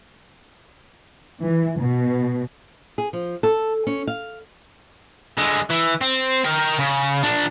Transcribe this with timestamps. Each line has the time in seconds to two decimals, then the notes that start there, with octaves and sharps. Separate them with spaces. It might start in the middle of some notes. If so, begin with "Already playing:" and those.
1.45 E3
1.80 B2
2.98 G#4
3.13 F3
3.43 A4
3.87 C#4
4.07 F5
5.38 D3 G#3
5.70 E3
6.01 C4
6.45 A#4 G5
6.79 C#3
7.24 A#2 D4